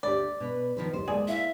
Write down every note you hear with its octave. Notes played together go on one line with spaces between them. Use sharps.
D2 G4 D5
B2 B4
D#3 F3 B4
F#1 D#2 C5
G#3 A#3 G#4 D5
E4 E5 F5